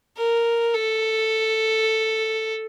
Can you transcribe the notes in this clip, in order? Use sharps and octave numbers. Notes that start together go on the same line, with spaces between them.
A#4
A4